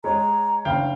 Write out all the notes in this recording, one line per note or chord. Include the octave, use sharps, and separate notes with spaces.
G#3 C#5 A#5
F#1 D4 F5 G5